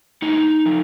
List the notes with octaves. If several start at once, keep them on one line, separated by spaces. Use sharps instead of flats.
A2 D#4
F3